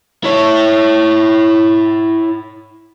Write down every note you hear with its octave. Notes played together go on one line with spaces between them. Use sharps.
E4 C#5